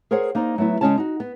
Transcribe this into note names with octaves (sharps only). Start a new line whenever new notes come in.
G#4 A#4 C5 C#5 F#5
A#3 D#4 C5 D5
F#3 A3 B3 E4
C#3 F#3 G#3 C#4 C#5 A5
D#4 F#4
B3